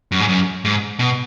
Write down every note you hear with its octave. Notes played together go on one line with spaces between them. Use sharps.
F#2
G#2
F#2
G#2
B2